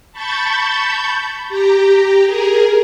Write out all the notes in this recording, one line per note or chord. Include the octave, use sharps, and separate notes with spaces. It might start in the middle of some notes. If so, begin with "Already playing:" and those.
A5 B5 C#6 G6 A6
G4 A#5
G#4 A#4